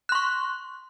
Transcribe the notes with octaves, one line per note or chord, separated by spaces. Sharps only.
C6 C#6 F#6